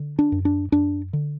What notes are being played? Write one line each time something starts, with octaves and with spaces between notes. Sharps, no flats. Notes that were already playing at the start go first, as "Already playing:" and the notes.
Already playing: D3
D4
F#2
D4
F#2 D4
D3